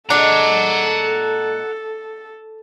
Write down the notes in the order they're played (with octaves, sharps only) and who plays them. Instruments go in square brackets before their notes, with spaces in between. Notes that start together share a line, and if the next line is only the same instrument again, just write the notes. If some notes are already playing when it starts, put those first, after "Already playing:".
[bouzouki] A#2 G#3 D#5 [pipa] D4 [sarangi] A4 [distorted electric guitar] F#5 A#5